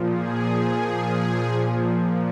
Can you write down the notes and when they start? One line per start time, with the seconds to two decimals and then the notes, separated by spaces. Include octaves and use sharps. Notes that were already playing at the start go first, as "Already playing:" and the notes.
Already playing: A#2 F3
0.11 G#4